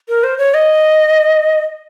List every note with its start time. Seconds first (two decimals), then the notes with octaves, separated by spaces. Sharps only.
0.09 A#4
0.23 C5
0.38 C#5
0.54 D#5